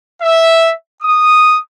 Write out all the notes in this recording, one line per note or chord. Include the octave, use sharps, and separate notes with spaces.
E5
D#6